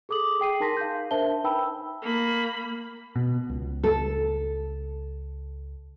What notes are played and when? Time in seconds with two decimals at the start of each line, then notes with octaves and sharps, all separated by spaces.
0.09 G#4 A4 D6 D#6 F#7
0.40 G#4 G5 C7 D#7
0.60 D#4 A#4 A5 C6 A#6 B6
0.77 F5 G6
1.11 D4 A#4 C5 E5 A5 G7
1.44 D#4 B4 G5 A5 B5 E6
2.02 A#3 B5
3.16 B2
3.49 C#2
3.84 A4